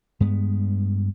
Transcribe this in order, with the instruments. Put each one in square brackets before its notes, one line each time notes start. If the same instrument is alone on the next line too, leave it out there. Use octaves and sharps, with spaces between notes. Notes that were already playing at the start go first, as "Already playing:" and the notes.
[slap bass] G2 G#3 B3